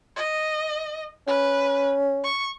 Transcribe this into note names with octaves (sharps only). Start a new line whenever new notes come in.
D#5
C#4 B4
C#6